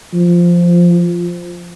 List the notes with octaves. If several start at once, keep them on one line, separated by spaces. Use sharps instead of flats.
F3